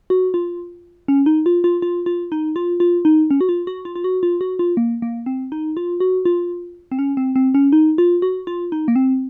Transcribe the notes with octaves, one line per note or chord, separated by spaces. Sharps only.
F#4
F4
C#4
D#4
F4
F4
F4
F4
D#4
F4
F4
D#4
C#4
F#4
F4
F#4
F4
F4
F#4
F4
F#4
F4
A#3
A#3
C4
D#4
F4
F#4
F4
C4
C#4
C4
C4
C#4
D#4
F4
F#4
F4
D#4
A#3
C4